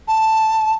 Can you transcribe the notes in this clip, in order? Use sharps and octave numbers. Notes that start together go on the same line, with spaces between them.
A5